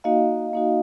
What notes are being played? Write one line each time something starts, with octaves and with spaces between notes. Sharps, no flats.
A#3 D#4 F#4 D#5 F5
A#3 D#4 F#4